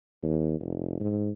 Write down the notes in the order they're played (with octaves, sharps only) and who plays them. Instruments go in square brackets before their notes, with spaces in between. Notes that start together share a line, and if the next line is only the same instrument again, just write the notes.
[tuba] D#2
F1
G#2